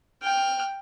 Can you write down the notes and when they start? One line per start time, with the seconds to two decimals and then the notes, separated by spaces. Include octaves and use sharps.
0.22 G5 F6